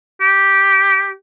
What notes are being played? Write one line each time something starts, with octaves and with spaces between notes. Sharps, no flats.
G4